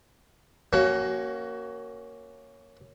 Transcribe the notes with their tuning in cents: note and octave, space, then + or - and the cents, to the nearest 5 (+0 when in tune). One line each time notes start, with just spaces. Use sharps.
A#3 +0 C#4 +0 F#4 +25